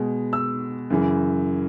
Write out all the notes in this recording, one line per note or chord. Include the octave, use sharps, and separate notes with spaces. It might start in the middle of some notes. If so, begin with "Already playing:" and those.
Already playing: B2 G#3
E6
F#2 C#3 E3